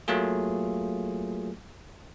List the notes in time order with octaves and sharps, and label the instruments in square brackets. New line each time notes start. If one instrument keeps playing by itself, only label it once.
[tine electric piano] F#3 A3 A#3 F4 G#4